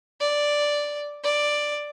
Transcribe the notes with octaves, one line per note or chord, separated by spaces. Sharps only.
D5
D5